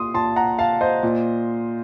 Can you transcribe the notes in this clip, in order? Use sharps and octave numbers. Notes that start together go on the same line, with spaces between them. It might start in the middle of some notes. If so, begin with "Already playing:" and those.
Already playing: A#2 C6 D#6
A#2 A5 C6
F#5 A#5
F5 A5
C5 D#5
A#2